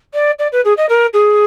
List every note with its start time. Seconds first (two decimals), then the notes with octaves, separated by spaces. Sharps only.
0.13 D5
0.39 D5
0.52 B4
0.64 G#4
0.77 D#5
0.89 A#4
1.13 G#4